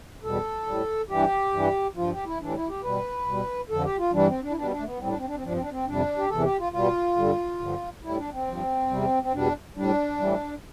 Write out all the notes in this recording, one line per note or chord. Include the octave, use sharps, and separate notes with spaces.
E2 B2 G3 A4
A2 G3
G2 E3 G3 G4
G2 E3 G3
G2 F3 F4
G4
E4
A2 E3 G3 D4
E4
G4
B2 G3 B4
B2 G3
F2 D3 F3 A4
G4
F4
G2 E3 G3 D4
C4
D4
E4
B2 G3 D4
D4
A3
B3
A2 G3 C4
D4
C4
D4
C4
G2 F3 D4
C4
D4
C4
F2 C3 G3 D4
G4
E2 C3 E3 A4
G4
F4
B2 G3 F4
G2 D3 G3
G2 D3 F3
A2 G3 E4
D4
C4
G2 F3
E2 C3 G3
C4
E2 B2 G3 D4
A2 G3 D4
A2 E3 G3